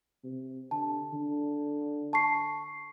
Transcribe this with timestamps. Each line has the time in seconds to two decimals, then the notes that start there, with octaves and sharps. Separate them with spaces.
0.24 C3
0.71 D3 A5
1.13 D3
2.13 A5 C#6 C7